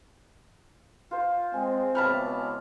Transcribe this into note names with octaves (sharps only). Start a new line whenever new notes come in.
F4 C5
G#3 C4 G#5
C#2 B2 E3 A5 B5 F6